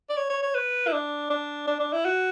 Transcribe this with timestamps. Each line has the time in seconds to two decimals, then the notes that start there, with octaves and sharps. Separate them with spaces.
0.10 D5
0.17 C#5
0.30 C#5
0.43 C#5
0.55 B4
0.87 E4
0.93 D4
1.30 D4
1.67 D4
1.80 D4
1.93 E4
2.05 F#4